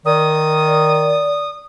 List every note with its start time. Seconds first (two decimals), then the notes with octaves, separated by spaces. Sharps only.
0.06 D#3 D5 D#6